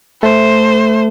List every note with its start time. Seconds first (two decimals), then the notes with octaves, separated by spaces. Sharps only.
0.22 A3 C5